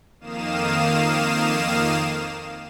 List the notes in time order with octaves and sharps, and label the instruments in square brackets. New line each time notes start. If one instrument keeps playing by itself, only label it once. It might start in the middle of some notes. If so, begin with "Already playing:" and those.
[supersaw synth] F2 D#3 A#3 F5 D#6 E7